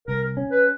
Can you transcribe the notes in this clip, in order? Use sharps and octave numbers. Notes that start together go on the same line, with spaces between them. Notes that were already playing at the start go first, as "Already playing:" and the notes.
C2 A#4
C#4
B4